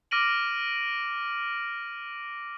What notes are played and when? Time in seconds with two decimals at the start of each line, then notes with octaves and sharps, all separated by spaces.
0.11 D6 F6 A#6 D7 D#7 F#7